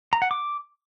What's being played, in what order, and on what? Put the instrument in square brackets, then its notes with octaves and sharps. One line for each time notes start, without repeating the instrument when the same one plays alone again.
[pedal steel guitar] A#5
F#5
D6